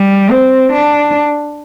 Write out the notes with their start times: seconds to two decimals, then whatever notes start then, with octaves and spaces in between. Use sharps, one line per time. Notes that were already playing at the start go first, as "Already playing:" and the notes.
Already playing: G3
0.31 C4
0.72 D4